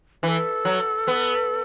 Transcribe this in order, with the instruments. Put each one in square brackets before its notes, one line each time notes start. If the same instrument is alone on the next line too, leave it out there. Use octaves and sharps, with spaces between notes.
[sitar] E3 [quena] B4
[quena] A4
[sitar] F#3
B3